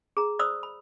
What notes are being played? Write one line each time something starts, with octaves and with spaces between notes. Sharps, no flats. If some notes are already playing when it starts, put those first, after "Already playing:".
G#4 A#5
C5 D5 B5 D#6 E6
B5